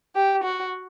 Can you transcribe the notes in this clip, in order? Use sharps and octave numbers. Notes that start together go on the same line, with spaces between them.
G4
F#4